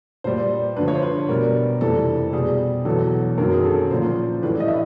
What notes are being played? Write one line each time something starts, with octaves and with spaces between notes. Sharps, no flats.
A#2 G3 C5
G2 D3 F3 B4
C#5
C5
B4
B2 G3 A#4
F2 C3 E3 G3 A4
B2 G3 G#4
E2 B2 F#3 A4
F#2 D#3 F#3 A#4
G#4
A4
A#2 F3 C5
A2 E3 G3 B4
D#5
E5